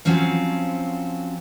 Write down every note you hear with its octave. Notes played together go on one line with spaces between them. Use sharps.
F3 F#3 C4 C#4 F5